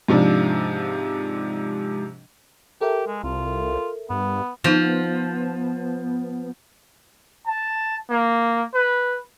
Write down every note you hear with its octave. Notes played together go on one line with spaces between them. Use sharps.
G#2 C3 F3 D4
G4 A4 A#4 E5
G#3
C2 F4
G2 B3
F3 B3 D#4 C5
A5
A#3
B4